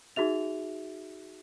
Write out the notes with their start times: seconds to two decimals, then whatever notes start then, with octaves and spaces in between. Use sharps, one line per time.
0.16 D#4 F#4 G#4 E5 F7